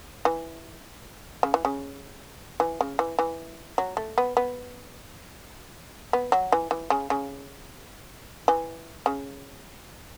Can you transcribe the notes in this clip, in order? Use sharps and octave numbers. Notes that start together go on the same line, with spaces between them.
E3
C#3
E3
C#3
E3
C#3
E3
E3
F#3
A3
B3
B3
B3
F#3
E3
E3
C#3
C#3
E3
C#3